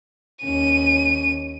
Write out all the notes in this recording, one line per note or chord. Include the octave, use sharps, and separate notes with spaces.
D#2 C#4 D#7